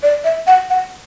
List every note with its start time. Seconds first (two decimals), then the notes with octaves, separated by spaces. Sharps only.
0.03 D5
0.25 E5
0.47 F#5
0.70 F#5